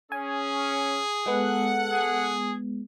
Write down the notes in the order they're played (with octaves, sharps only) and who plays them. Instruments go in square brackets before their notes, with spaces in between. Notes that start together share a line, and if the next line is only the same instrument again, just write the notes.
[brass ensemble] C#4 [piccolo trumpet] G#4 [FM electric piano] G#5
[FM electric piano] G#3 B3 [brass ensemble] A4 F#5
[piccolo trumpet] G#4